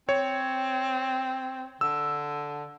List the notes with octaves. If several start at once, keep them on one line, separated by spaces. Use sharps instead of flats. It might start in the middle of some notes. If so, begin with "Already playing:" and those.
C4 C#5
D3 E6